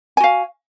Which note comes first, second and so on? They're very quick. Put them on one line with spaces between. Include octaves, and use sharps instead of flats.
G#5 F#4 F5